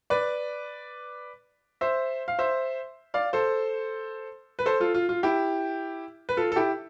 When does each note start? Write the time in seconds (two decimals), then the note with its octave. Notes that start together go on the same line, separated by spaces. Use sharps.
0.10 B4 D5
1.81 C5 E5
2.28 F5
2.39 C5 E5
3.14 D5 F5
3.33 A4 C5
4.59 B4
4.66 A4 C5
4.80 F4 A4
4.94 F4
5.09 F4
5.23 E4 G4
6.29 B4
6.37 F4 A4
6.52 A4
6.56 E4 G4